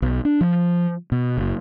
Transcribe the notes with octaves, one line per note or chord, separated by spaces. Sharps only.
B1
D4
F3
B2
F#1